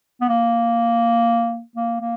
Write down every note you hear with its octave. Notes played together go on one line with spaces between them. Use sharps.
B3
A#3
A#3
A#3